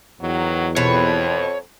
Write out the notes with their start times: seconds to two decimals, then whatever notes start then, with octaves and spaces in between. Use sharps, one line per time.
0.21 E2 B2 D#3 F#3
0.76 F2 B2 C#5